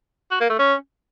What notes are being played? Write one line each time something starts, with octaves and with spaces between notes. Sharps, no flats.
F#4
A#3
A3
C#4